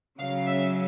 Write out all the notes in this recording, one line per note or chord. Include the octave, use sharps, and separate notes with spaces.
C#3 F#3 F5
E5